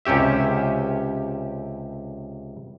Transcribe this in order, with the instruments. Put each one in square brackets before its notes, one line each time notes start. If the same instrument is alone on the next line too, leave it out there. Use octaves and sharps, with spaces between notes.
[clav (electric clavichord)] C#2 C3 C#4 G4 E5